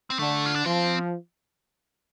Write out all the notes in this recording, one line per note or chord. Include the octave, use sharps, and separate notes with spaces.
C4
D3 A3
F4
D4
F3 C4